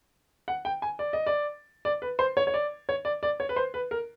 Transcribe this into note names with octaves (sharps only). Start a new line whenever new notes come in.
F#5
G5
G#5
D5
D#5
D5
D5
B4
C5
C#5
C#5
D5
C#5
D5
D5
C#5
B4
C5
B4
A#4